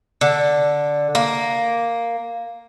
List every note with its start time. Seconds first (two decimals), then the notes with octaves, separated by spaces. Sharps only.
0.21 D3
1.15 A#3